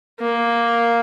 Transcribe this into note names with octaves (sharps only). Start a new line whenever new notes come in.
A#3